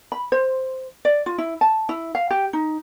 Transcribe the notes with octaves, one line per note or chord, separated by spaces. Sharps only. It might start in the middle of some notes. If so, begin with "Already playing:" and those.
B5
C5
D5
F4
E4
A5
E4
F5
G4
D#4